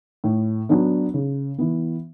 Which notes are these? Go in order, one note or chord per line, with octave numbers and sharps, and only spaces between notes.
A2
F#3 B3 D4
C#3
E3 B3